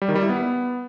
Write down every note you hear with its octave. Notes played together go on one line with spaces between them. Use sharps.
G3
D#3
G3
E4
B3